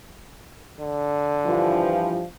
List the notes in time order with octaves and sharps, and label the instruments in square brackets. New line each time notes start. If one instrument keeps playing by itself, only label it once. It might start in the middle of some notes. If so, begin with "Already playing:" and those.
[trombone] D3
[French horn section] G2 E3 F3